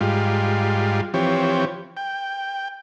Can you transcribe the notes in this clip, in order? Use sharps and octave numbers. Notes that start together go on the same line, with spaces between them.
G#2 G3 F4
E3 F3 C4 G4 C#5
G5